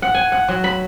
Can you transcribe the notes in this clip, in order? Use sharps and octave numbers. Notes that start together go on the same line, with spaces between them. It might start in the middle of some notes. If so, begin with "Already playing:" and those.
F#5
G#5
F#5
F#3
B5